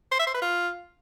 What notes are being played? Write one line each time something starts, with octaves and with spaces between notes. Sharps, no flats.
C5
E5
C5
B4
F4